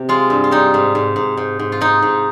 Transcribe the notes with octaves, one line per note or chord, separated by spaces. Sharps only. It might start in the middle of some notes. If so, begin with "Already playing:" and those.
Already playing: C3
G#3 F4
G2
F4
G3 D#4
G#2
G#2
G#2
G#2
G#2
F4
G#2 D#4
G#2